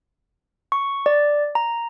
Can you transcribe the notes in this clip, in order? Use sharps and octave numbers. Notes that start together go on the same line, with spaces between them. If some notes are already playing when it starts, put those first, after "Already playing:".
C#6
D5
A#5